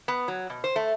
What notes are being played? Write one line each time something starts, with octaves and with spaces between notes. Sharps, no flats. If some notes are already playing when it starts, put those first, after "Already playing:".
B3
F#3
B2
C5
A3